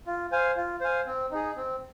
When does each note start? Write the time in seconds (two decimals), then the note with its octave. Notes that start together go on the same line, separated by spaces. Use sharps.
0.07 F4
0.32 C5 F5 G#5
0.56 F4
0.81 C5 F5 G#5
1.06 C4
1.31 D#4 G#4
1.56 C4